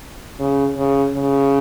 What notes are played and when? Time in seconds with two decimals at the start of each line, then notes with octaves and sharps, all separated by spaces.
0.40 C#3
0.77 C#3
1.14 C#3